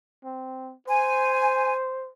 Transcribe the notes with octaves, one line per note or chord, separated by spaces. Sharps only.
C4
C5 G#5